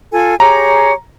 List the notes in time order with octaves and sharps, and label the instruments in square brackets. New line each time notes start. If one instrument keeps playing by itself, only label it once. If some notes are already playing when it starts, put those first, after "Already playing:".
[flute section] F4 A4 G#5
[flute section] G4 G#4 C#5 [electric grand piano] A#5